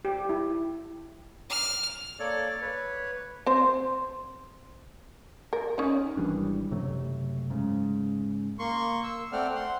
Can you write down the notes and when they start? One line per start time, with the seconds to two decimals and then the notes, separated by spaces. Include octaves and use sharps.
0.05 G4
0.29 E4
1.50 F6
2.19 A#3 A4 C#5 D5
2.61 B4 C#5
3.46 C4 C5
5.53 A#4
5.78 C#4 D#4
6.17 G#1 E3 G3 D4
6.71 F#1 C3 F#3 A3
7.50 G#2 C#3
8.59 A#3 C6 C#6
9.04 E6
9.32 A3 C4 D5 F#5 G5 F6
9.55 F#5 C6